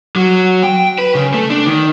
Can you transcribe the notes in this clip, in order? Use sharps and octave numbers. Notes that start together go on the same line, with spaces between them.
F#3
G5
B4
C#3
A3
D4
D#3